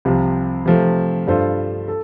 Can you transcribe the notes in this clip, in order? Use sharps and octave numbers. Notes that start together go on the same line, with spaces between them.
C2 C3 F3
C3 F3 A3
G2 G3 F4 A4 C5
A4